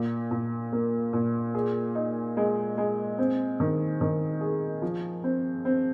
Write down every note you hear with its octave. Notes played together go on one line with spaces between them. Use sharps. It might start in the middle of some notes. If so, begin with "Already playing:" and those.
Already playing: A#2
A#2
A#3
A#2
G#4
D#4
G#3
G#3
C4
D#3
D#3
G#4
F3
C4
C4